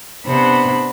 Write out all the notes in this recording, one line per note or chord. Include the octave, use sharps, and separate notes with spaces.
C3 B3 D4 C5 B5